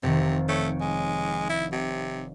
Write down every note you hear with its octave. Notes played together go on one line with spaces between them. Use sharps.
F1 C3 D#3
A3 G4 C#5
G#3
E4
C3